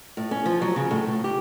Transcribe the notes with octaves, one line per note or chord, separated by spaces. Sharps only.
A2
C#4
F3
F#3
C#3
A2
A2
G4